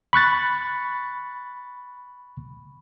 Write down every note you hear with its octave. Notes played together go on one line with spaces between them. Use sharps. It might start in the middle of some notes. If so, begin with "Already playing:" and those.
B5 C#6 F#6 A6